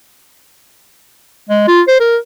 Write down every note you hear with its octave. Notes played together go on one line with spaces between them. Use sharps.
G#3
F4
C5
A#4